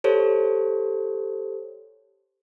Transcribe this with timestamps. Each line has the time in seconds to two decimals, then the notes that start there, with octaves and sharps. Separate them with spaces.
0.04 G4 A4 C5 C#5